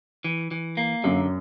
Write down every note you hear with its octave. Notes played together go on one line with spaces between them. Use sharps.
E3
E3
A#3
F#2 D3